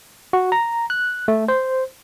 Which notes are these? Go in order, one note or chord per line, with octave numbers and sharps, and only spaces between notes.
F#4
A#5
F#6
A3
C5